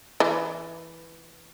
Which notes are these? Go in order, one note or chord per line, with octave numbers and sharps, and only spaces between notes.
E3